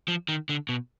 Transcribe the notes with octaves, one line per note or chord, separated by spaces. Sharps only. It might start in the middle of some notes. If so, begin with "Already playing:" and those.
F3
D#3
D3
B2